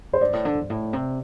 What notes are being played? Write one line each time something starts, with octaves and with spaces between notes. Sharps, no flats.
A2 C5
G2 D5
A2
D3
E2
G2
A2
C3